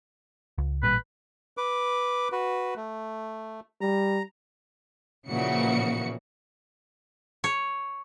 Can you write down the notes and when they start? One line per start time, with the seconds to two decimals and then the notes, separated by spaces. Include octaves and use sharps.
0.58 C#2
0.83 A1 A#2 G3 B4
1.57 B4 D6
2.32 F#4 B4
2.76 A3
3.81 G3 A#5
5.28 A#2 C#3 E3 F3 F#4 C#7
7.44 C#5